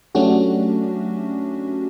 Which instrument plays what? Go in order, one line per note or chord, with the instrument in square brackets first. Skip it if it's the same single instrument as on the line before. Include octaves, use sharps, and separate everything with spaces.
[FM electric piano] F#3 A3 C#4 D4 F#4 G4